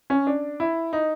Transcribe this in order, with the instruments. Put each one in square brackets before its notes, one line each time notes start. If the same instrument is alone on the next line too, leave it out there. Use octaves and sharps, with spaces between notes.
[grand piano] C#4
D4
E4
D#4